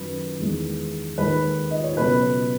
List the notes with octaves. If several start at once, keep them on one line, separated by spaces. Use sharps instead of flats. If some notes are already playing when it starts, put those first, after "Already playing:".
Already playing: F#2 D#3 F#3 B4
E2 D#3 G#3
D#2 D#3 G#3 B4
D#5
C#5
C#2 B2 F#3 B4